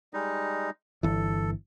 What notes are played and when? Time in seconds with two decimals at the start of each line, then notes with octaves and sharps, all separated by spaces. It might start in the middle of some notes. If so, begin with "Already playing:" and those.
0.14 G3 G#3 D#4
1.03 G1 E3 A4